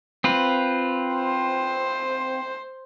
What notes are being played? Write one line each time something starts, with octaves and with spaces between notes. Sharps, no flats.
C4 F4 B4
C5